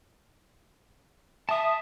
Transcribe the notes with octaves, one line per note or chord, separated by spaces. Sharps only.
E5 A5 D#6